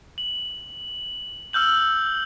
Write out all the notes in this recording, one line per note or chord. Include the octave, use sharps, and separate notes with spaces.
F#7
E6 F6 G6 F#7